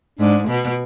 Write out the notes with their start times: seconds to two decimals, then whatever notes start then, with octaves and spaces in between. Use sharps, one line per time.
0.19 G#2 D4
0.48 B2